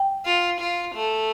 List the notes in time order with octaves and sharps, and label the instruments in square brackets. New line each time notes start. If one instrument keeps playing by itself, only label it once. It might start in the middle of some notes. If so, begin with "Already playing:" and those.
Already playing: [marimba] G5
[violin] F4
F4
A3